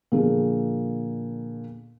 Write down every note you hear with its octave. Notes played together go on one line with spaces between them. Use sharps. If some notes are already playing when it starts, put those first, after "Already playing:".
A#2 D3 F3 G#4